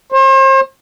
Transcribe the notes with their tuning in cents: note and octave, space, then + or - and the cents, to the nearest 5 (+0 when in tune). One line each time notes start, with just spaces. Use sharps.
C5 +40